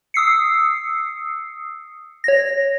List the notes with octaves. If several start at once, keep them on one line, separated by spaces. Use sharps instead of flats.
D#6 E6 C7 C#7
C#5 A#6